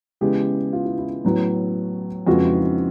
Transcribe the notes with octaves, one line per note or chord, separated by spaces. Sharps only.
C#3 E3 G#3 B3 G4
F4
E4
E4
A2 F#3 B3
F2 C#3 F3 G#3 B3 F#4
E4
D#4
E4